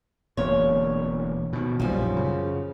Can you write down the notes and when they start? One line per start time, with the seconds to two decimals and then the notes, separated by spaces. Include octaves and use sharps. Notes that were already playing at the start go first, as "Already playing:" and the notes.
0.37 E1 D2 A#3 C#5
1.53 B2 D#3
1.80 A#1 F#2 F3 G3
2.16 C#3